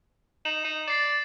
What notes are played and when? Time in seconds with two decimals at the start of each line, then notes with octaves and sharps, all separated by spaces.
0.45 D#4 E7 F#7
0.64 D#4
0.88 D5 A6 C7 E7